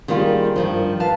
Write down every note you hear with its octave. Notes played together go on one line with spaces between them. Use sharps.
D#3 G3 A#3 F4 G#4
G2 D#3 F3
B4 F5 A5